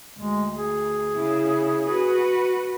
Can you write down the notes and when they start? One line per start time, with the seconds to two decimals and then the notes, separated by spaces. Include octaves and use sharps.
0.18 D2 G#3
0.57 G#4
1.15 C#3 E4
1.89 F#4 B4